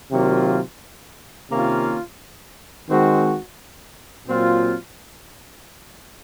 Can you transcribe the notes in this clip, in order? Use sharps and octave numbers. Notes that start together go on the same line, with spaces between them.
C3 D#3 F#3 A#3 F4
C3 D#3 A#3 C#4 F4
D#3 G#3 C4 F#4
A#2 F#3 C4 F4